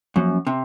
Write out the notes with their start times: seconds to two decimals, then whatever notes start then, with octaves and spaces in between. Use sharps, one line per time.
0.16 F#2 F3 A#3 C#4
0.47 C3